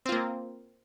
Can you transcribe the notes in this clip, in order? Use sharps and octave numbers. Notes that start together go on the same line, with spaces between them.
A#3 C4 F4